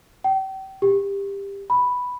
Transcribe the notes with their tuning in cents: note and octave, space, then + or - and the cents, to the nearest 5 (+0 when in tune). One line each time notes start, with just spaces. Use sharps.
G5 -35
G4 +20
B5 +0